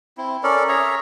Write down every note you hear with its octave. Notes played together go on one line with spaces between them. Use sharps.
C4 E4
C#4 A4 A#4 D5
G#4 C#5 E5 A#5